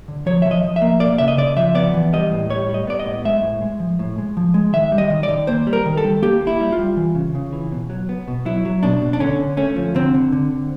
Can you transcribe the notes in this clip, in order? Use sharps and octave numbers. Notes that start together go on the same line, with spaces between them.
D3
F3 C#5
F3 E5
D#5
F3
E5
A#3
A#3 D5
C#3 E5
D#5
C#3 D5
F3 E5
B3 D5
E3
G3 D#5
A2
G3 C#5
G3
D#5
B3 D5
D#5
A2
G#3 E5
A2
G#3
F3
A2
G#3
F3
G#3
D#3 E5
G3
D#5
D#3
D5
D#3
A#3 C5
G3
A#4
D#3
A4
G3
A#3 G4
A#3
E4
G3
F4
G3
E3
C#3
C#3
E3
B2
F#3
B3
B2
F#3 E4
F#3
B2 D4
B2
D4
D3 C#4
D3
A3 C#4
F3
D3 C4
D3
D3
D3